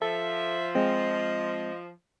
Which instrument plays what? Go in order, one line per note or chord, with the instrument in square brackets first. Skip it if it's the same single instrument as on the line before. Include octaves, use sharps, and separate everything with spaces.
[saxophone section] F3 [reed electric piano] A4 [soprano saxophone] E5
[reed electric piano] G#3 C4 [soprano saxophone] D#5